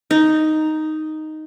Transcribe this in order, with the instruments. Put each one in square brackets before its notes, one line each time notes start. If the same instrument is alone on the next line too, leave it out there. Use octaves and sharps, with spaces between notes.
[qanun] D#4